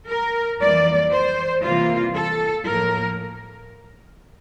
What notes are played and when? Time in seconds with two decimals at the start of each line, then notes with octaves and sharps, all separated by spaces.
0.08 A#4
0.59 F2 E3 G3 A#3 D5
1.11 C5
1.63 C3 E3 G3 A#3 F4
2.15 A4
2.67 A2 F3 A#3 A#4